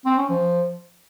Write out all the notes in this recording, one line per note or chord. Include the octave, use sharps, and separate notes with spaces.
C4
C#4
F3